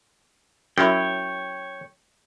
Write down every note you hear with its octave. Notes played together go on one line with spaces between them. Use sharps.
F#2 E4 C#5 G5